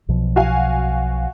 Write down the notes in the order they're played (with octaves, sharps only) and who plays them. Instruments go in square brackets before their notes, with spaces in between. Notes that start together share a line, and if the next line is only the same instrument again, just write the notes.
[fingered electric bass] B1 B2 F3
[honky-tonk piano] F#4 F5 G#5